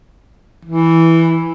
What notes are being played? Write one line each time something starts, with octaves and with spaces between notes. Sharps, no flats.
E3